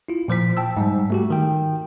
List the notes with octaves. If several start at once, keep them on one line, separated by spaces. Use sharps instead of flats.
E4 F4
A#2 F3 C5 B6
G5 A5 E6
G#2 G3
A3 F#4 G4
D#3 G5